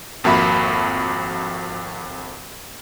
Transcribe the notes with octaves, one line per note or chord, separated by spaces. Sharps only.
G#1 F2 A#3 F#4 E5 B5